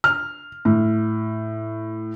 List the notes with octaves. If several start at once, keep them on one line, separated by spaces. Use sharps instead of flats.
F6
A2